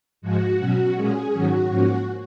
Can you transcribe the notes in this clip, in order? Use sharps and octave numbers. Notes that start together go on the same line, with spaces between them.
G#2 F3 G#3 F#4
B2 F#3 C#4
A#2 G#3 C#4 G#4
G#2 D#3 F#3 C#4 F#4
G#2 F3 A#3 C#4